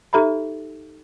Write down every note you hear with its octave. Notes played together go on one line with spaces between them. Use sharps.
D#4 G4 A4 E5 A#5 B5